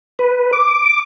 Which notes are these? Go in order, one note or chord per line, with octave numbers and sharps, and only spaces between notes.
B4
D6